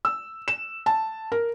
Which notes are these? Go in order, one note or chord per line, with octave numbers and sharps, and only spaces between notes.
E6
E7
A5
A#4